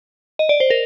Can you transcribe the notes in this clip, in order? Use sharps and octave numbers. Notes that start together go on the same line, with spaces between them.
D#5
D5
C5
A#4